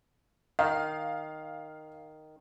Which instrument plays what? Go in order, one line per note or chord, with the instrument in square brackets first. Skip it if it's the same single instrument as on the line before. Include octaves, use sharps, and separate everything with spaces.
[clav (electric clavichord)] D#3 [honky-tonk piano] F5